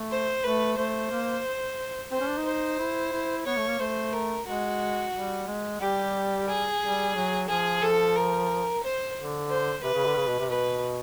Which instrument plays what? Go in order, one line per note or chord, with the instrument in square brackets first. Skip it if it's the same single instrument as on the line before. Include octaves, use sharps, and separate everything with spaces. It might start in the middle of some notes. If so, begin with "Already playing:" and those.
Already playing: [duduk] A3
[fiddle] C5
[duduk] A3 [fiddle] B4
[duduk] A3 [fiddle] C5
[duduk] A#3
[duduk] C4 [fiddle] C5
[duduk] C#4
D4
D#4
[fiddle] C5
[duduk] E4
E4
[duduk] B3 [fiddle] C#5
[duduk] A3
A#3
[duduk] A3 [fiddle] C5
[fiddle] A#4
[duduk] G#3 [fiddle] F#4
[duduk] G3
G#3
[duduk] G3 [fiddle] G4
[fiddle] G#4
[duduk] G3
F#3
[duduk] F3 [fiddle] G#4
[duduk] F3 [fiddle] A4
[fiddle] A#4
C5
[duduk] D3
[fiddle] C5
[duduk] C3 [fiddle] B4
[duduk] C#3
D3
C#3
B2
C3
[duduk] B2 [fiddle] B4